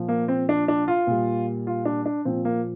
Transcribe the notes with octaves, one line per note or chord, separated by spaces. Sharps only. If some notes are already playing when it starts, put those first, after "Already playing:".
Already playing: A#2 F3
A#3
C4
D4
D4
F4
A#2 G3
F4
D4
D4
A#2 F3 C4
A#3